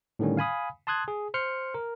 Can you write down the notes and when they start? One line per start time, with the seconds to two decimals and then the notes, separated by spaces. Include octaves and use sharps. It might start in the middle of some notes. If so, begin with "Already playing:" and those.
0.19 A2 D3 D#3 G3 C#4
0.37 F5 G#5 B5 D#6
0.87 A5 C6 D#6 F#6 G#6
1.08 G#4
1.34 C5 C6 F6 C#7
1.74 A#4